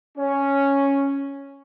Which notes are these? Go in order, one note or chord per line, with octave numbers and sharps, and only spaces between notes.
C#4